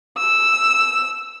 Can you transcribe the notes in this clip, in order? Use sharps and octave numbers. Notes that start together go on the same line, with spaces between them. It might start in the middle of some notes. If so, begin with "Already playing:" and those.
E6